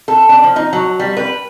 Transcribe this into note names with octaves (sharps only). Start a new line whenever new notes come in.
A4
D4
F3
D#4
F#3
G3
B4